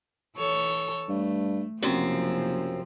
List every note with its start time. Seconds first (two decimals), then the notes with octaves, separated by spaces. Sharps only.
0.37 E3 A4 C#5
1.09 G2 A3
1.82 F#1 F#2 C3 F3 C4